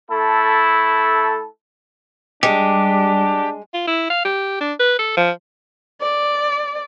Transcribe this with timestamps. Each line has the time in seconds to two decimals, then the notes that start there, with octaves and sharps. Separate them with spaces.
0.11 A3 E4 A4
2.43 G3 G#3 D4 G4
3.74 F4
3.87 E4
4.10 F5
4.25 G4
4.61 D4
4.80 B4
4.99 A4
5.17 F3
6.00 D5